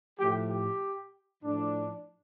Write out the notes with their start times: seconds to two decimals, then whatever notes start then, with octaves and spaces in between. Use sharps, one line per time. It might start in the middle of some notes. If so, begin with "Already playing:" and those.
0.18 A2 F3 A3 G4
0.49 G4
1.43 A2 F3 D4